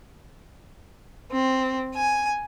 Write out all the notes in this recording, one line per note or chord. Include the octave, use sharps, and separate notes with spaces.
C4
G#5